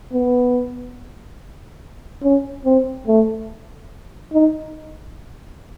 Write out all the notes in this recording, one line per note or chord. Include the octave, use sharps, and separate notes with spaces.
B3
C#4
C4
A3
D#4